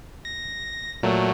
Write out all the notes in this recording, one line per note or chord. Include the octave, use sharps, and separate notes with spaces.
A#6
A#2 F#3 A3